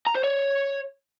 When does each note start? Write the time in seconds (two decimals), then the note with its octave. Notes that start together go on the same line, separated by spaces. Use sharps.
0.07 A#5
0.15 C5
0.24 C#5